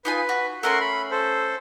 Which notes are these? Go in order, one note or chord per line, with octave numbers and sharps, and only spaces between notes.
D#4 F4 B4 G#5
F#4
A3 C#4 A#4 F#5 C6
B5
A4 C5